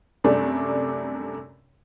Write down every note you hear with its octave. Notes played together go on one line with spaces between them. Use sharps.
F#2 C3 G3 A3 D4